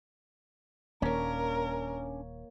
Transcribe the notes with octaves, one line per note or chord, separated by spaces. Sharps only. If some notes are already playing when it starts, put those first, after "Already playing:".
D#1 D#3 A#3 C#4 D4 A#4 C#5